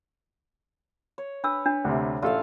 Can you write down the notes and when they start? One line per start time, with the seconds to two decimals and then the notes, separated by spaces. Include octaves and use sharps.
1.18 C#5
1.44 D4 B4 E6
1.66 D4
1.84 D2 C3
2.22 A1 F4 A4 F5